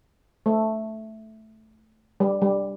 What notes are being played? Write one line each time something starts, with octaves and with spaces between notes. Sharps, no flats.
A3
G3
G3